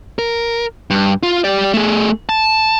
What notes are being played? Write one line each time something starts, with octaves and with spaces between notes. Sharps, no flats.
A#4
G2
F4
G4 D5
A3 G#4
A5